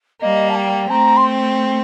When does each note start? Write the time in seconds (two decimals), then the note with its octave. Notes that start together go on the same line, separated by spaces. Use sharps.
0.21 G3 A#3 D#5
0.50 A5
0.56 G5
0.90 A3 C4 A#5
1.17 C6